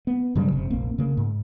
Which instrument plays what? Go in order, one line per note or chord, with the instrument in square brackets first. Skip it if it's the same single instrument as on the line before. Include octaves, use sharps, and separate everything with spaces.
[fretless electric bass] B3
G2 C#3 F#3 G3
F#1 C3
F1 A#1 A#3 C4
C#3 A#3
G#2